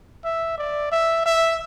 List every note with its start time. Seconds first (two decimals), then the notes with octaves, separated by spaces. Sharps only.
0.24 E5
0.58 D5
0.92 E5
1.26 E5